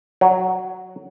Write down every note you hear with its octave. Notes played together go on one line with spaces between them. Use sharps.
F#3